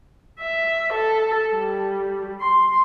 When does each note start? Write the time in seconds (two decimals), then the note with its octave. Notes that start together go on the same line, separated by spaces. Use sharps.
0.40 E5
0.93 A4
1.54 G3
2.41 C6